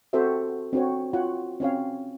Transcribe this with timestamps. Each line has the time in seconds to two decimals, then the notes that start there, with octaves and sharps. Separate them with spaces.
0.13 C4 F#4 G4 A4 C5 E5
0.73 C4 D4 F#4 C5 C#5
1.13 F4 F#4 C#5 F#5 G5
1.60 C4 C#4 C#5 F5